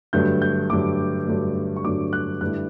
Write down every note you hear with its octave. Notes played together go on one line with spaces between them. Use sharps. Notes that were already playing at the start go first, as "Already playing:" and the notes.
G2 D3 F#3 A3 G6
G6
G2 D3 F#3 A3 D6
G2 D3 F#3 A3
C#6
G2 D3 F#3 A3 D6
F#6
G2 D3 A3 E4 F#6